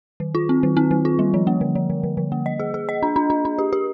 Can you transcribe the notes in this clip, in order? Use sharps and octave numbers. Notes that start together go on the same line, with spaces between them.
D#3
F4
C4
D#3
C4
D#3
F4
G3
F3
A#3
D3
F3
D3
D3
D3
A#3
D#5
G#4
G#4
D#5
D4
D4
D4
D4
G4
G4